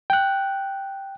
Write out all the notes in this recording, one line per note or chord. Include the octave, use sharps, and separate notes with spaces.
G5 F#6